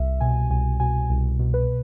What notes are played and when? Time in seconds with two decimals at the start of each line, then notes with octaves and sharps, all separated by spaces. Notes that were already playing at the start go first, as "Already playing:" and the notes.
Already playing: C2 E5
0.21 B2 G#5
0.50 C2 G#5
0.80 B2 G#5
1.10 C2
1.39 B2
1.54 B4